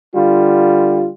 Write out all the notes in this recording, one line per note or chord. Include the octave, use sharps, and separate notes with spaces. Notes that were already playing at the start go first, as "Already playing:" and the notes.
D3 G3 F4